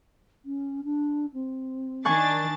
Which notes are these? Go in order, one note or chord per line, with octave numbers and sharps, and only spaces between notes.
C#4
D4
C4
D#3 D4 G#5 C#6 F#6 A6